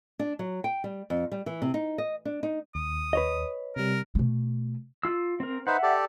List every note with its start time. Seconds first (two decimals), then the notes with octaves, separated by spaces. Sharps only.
0.19 D4
0.39 F#3
0.64 G5
0.84 G3
1.10 F2
1.32 G3
1.46 E3
1.62 C3
1.74 D#4
1.98 D#5
2.25 D4
2.43 D#4
2.75 D#2 D#6
3.13 B4 C#5 D#5
3.76 C3 G3 A#4
4.15 B2 A3
5.03 F4 E6
5.40 C4 A#4
5.67 D#4 B4 C5 E5 F#5
5.83 G4 A4 D5